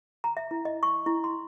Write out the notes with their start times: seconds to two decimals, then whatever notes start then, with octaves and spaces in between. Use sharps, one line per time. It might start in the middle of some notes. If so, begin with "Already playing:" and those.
0.24 A#5
0.37 E5
0.51 E4
0.65 D#5
0.83 C#6
1.06 E4
1.24 C6